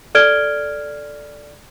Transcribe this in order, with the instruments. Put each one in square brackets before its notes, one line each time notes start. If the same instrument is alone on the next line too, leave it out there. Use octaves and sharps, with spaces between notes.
[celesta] A4 D5 F6 G#6 D7 G7